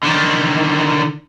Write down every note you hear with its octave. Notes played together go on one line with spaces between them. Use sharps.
D3 D#3